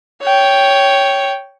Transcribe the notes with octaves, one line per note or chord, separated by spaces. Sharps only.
C#5 G5